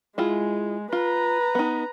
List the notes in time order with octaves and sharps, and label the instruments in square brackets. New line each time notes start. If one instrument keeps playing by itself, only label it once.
[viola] G#3 [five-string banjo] E4 F4 G#4
[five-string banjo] F4 [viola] B4 A#5
[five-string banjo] B3 D#4